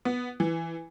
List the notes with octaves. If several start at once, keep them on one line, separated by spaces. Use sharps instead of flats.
B3
E3